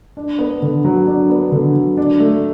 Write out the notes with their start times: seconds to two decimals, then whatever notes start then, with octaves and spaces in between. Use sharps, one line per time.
0.17 D4
0.39 B3
0.62 D3
0.84 F#3
1.07 D4
1.29 B3
1.52 D3
1.75 F#3
1.97 D4
2.20 A3